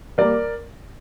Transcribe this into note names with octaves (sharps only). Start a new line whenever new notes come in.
G3 A#3 A#4 D5